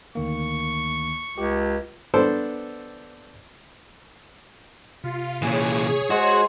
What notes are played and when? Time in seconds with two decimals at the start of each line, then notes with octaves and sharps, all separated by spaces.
0.15 D2 D#3 A#3 C#6
1.38 C#2 G4
2.14 B3 D4 A4 C5 D5
5.04 C3 F4
5.42 A#2 E3 G#4 C#5
6.10 G#3 F#4 C5 D#5